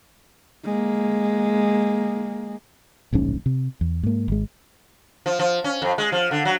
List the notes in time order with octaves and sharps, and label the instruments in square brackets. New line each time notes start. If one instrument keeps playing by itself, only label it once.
[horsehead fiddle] G#3 A#3
[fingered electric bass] D1 A#1 G#2 C#4
C3
E2
G#2 A#3
G#1 G#3
[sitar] F3
F3
C#4
F2
G#3
F3
D3
F#3